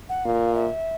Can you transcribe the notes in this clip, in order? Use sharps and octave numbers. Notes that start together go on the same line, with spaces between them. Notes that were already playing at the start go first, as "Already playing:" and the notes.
F#5
A#2 F5
E5